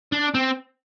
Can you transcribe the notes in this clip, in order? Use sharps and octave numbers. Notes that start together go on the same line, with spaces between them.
D4
C4